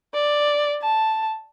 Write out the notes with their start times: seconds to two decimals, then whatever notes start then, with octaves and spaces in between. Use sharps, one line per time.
0.14 D5
0.82 A5